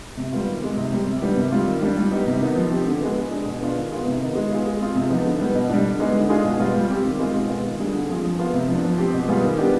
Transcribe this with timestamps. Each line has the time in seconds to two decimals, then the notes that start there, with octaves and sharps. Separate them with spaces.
0.17 C3
0.32 G3 B3 F4
0.47 D#3
0.62 G#3 C4
0.77 C3
0.92 G3 C4 G4
1.06 C3
1.22 D#3 G3 B3 D4
1.37 C3
1.52 G3 C4 F4
1.67 D#3
1.81 G3 D4
1.97 G3
2.11 B3 D#4 G4
2.27 C3
2.41 D#3 B3 D#4
2.56 F3
2.71 C4 G4
2.86 D3
3.01 G#3 B3
3.16 G#3
3.31 D4 G#4
3.46 B2
3.60 B3 D4 F4
3.76 D#3
3.91 B3 F4 G#4
4.06 C3
4.21 D#3 B3 D#4
4.35 G#3
4.50 B3 F4 G#4
4.65 G#3
4.80 C4 F4 G#4
4.95 C3
5.10 F3 B3 D#4
5.25 D3
5.40 G3 B3
5.55 B2
5.70 G3 D4
5.85 D3
6.00 G#3 B3 D#4
6.15 D3
6.29 G#3 D4 F4 G#4
6.44 B2
6.59 G3 B3 F4
6.74 G3
6.90 C4 G4
7.04 D#3
7.19 G#3 C4 F4 G#4
7.34 B2
7.49 G#3 B3 F4
7.63 D#3
7.79 G3 D4 G#4
7.94 D3
8.09 F3 C4 F4 G#4
8.24 F3
8.39 B3 F4
8.54 C3
8.68 F3 B3 D4
8.84 F3
8.98 C4 G4
9.14 B2
9.28 G3 B3 F4 G#4
9.44 D#3
9.58 B3 D4 G4